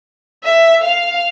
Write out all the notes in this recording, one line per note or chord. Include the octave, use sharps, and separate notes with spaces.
E5
F5